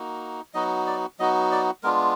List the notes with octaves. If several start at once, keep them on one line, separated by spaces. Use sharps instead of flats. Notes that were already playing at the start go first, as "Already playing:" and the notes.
Already playing: A#3 D#4 F#4
F#3 B3 D#4 F#4 D#5
D5
F#3 B3 D#4 F#4 D#5
D5
G#3 B3 D4 F4 A#4